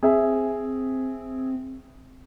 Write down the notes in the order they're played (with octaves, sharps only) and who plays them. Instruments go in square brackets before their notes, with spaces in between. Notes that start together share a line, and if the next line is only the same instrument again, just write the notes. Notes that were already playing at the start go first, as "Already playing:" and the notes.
[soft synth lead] C4 [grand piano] G#4 E5 G#5